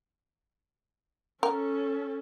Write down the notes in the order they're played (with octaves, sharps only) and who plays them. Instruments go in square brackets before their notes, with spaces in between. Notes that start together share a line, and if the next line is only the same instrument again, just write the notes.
[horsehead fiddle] C#4 A4 [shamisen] A#4